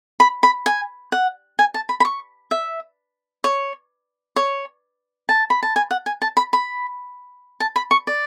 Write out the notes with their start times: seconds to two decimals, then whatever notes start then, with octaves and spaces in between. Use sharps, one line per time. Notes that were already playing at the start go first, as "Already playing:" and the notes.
0.20 B5
0.43 B5
0.66 G#5
1.12 F#5
1.59 G#5
1.74 A5
1.89 B5
2.00 B5
2.05 C#6
2.51 E5
3.44 C#5
4.36 C#5
5.29 A5
5.50 B5
5.63 A5
5.76 G#5
5.91 F#5
6.06 G#5
6.22 A5
6.37 B5
6.53 B5
7.60 A5
7.76 B5
7.91 C#6
8.07 D5